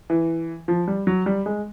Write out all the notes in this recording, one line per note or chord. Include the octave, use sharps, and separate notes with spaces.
E3
F3
G3
F#3
G3
G#3